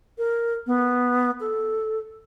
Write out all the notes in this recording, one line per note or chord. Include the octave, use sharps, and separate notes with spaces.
A#4
B3
A4